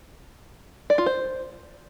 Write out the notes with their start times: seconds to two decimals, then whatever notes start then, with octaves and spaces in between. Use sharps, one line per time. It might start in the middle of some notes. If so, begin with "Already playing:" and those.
0.90 D5
0.98 F4
1.06 C5